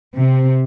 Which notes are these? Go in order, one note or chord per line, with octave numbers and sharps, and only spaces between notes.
C3